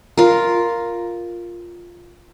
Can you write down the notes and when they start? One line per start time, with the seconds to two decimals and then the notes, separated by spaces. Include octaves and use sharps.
0.18 F4 A#4